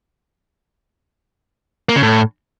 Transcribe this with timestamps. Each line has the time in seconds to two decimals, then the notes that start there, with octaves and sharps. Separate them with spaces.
1.89 A#3
1.96 C#3
2.02 A2